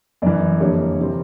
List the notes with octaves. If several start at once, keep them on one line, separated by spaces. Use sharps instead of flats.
F#2 C#3 E3 D5
F2 D3 G3 A#3 C#5
C3 E3 G3 C4